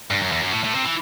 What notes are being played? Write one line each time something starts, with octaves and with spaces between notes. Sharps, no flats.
G2
F#2
E2
F#2
A2
A2
C3
E3